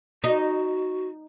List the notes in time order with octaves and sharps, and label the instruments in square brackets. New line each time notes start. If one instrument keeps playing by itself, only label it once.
[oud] D#4 [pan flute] F#4